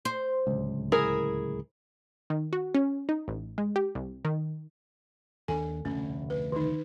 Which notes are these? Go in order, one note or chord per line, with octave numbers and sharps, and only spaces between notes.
C5
D1 C#2
E4 G#4 A#4
D#3
F#4
C#4
D#4
A1
G#3
G4
C2
D#3
D#2 B3 D4 A4 G#5
F1 D2 B2 C#4
B4
D#3 D#4